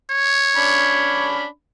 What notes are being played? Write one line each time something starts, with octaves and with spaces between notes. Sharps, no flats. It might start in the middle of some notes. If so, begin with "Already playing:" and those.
C#5
C#4 D4 B5